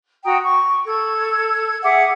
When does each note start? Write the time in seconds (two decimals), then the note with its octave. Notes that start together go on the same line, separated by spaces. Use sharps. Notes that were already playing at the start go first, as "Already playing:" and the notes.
0.25 F#4 G5 A#5 D#6
0.43 C#6
0.86 A4 G#6
1.83 G#4 E5 F#5 D6